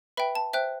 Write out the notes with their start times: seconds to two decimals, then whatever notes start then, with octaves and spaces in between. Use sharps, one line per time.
0.17 B4 E5 G5 B5
0.35 A5
0.53 C5 E5 G5 F#6